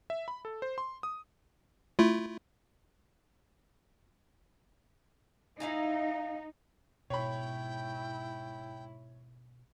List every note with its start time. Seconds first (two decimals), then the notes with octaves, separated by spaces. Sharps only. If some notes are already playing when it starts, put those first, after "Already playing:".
0.10 E5
0.28 B5
0.45 A4
0.62 C5
0.78 C6
1.03 D#6
1.99 A3 E4 F4
5.60 D#4 E4 F5 G#5
7.10 G#2 B2 E4 C#5 G5 B5